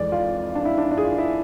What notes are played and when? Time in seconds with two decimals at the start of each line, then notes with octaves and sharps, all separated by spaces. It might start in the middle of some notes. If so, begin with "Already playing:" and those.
Already playing: F2 E3 G#3 D5
0.12 F4
0.55 D4
0.65 E4
0.78 D4
0.91 D4
0.98 G#4
1.04 F4
1.18 E4